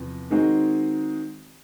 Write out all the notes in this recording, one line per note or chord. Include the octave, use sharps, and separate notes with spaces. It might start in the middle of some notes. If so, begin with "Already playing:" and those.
Already playing: E2 C3 F3
D#3 G#3 C4 D#4 F#4